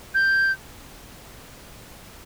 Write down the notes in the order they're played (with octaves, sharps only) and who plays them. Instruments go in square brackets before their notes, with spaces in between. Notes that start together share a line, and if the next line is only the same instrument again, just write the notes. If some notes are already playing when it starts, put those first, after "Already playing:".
[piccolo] G6